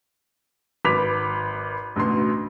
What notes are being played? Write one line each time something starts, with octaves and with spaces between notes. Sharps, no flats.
G#1 B4 D6 B6 F7
A1 D2 B2 C6